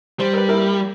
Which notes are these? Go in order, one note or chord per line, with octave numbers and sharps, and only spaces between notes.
G3 C5
A#4 B4
A#3 E4 A#4